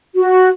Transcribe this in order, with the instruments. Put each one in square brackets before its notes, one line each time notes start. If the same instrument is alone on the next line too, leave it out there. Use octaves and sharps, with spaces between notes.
[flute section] F#4